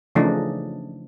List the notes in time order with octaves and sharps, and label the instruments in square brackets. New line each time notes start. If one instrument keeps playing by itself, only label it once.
[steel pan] C#3 E3 F3 A3 D4 D#4